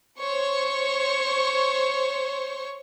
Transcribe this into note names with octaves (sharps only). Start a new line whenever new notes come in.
C5 C#5 C#6